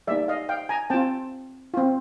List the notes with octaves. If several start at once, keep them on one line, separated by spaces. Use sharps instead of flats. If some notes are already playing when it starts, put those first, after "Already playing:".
G3 A#3 D#4 D5 E5
D#5 F5
F5 G5
G#5 A#5
C4 F4 G5 A5
C4 F4